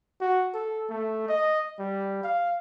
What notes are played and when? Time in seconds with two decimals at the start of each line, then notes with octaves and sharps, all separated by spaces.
0.21 F#4
0.54 A4
0.90 A3
1.29 D#5
1.79 G3
2.24 F5